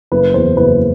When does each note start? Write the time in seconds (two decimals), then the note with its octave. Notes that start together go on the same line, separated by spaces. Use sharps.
0.12 F#1 B4
0.34 E2 C5
0.57 F#1 B4